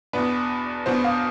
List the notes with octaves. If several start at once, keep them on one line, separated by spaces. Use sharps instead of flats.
E2 B2 B3 D4 B4
E2 B2 B3 D4 C5
F5